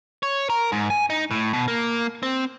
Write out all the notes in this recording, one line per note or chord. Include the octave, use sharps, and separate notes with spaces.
C#5
A#4
G#2
G#5
D#4
A2
B2
A#3
C4